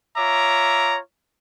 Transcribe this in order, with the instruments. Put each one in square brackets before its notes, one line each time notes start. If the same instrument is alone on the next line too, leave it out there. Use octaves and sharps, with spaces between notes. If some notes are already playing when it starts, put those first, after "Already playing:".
[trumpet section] F4 C#5 E5 A#5 D6